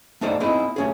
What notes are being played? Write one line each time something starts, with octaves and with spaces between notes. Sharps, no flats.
A3 B3 D#4 A4 C5 D5
B3 C4 D#4 E4 G#4 D#5
A3 C#4 G#4